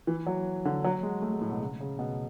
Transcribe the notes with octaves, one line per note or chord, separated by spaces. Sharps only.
E3
F#3
D3
F#3
G#3
A3
G#3
A2
B2
C#3
C#3
B2